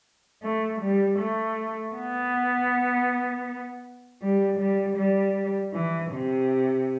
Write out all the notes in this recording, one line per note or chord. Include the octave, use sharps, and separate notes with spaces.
A3
G3
A3
B3
G3
G3
G3
E3
C3